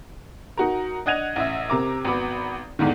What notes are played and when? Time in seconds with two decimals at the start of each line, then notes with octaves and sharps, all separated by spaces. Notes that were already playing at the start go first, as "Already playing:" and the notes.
0.57 D#4 F#4 A#4
1.06 D4 D#5 F#5 G#6 D#7 F7
1.36 A1 E5
1.70 C3 C4 A#4 D6
2.05 G#1 B3 F#4 B5 D6
2.79 E2 G#2 D3 D#3